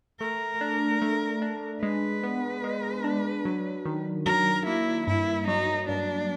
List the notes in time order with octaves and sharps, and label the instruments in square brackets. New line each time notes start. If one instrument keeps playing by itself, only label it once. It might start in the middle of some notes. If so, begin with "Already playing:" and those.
[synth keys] A3 [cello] A#4
[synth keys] D4
A3
D4
[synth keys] G#3 [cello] B4
[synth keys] B3
G#3
D4
F#3
D#3
[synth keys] F#3 [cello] A#4
[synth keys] A#3 [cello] E4
[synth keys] G2 [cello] E4
[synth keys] F#3 [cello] D#4
[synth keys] G2 [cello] D4